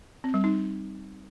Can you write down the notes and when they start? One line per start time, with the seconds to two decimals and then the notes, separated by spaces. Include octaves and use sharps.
0.24 C4
0.34 G3
0.44 D#4